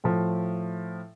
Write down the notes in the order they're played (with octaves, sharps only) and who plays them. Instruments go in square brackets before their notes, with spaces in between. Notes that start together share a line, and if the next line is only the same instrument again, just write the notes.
[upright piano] A2 F3